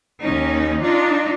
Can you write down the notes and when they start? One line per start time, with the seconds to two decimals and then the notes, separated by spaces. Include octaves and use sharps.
0.22 D#2 C#4 D#4
0.83 D4 D#4 F4